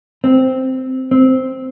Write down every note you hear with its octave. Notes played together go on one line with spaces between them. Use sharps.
C4
C4